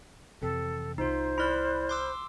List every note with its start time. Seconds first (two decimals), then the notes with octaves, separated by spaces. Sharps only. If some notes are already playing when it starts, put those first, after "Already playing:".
0.42 F2 C3 E3 A4
0.98 C2 D#4 F4 C5
1.38 E4 D5 B5 F6 F#6
1.89 C6 D6 E6